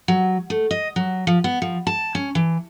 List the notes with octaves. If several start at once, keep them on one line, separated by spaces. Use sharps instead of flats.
F#3
A3
D#5
F#3
F3
B3
F3
A5
C#4
E3